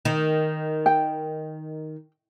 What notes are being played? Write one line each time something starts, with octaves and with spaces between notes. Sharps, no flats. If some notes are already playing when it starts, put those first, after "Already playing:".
D#3
G5